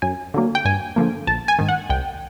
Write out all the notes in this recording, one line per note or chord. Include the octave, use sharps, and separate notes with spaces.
F#2 G#5
D3 F#3 A#3
G5
G2 G#5
D3 F3 A#3
A#1 A5
G#5
G#2 D#3
F#5
C2 G5